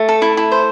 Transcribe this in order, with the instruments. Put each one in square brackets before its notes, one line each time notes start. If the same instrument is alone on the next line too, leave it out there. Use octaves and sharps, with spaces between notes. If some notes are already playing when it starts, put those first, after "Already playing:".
Already playing: [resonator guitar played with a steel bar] A3
[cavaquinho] A4
E4
E4
C5